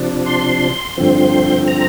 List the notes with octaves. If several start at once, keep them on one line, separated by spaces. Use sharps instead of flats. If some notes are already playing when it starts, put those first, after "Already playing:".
Already playing: C3 F3 D4
C6
G2 D3 F3 C4
A#5